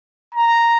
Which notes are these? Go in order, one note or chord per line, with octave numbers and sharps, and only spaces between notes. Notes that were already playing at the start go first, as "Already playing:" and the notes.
A#5